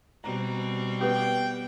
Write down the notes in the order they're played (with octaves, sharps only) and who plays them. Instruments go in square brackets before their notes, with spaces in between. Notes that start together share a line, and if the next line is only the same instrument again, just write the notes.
[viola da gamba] B2 G3 C4 [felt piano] A#5
[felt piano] B3 G4 [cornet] G5